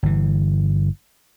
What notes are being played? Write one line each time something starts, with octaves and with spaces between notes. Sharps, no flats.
G1 E3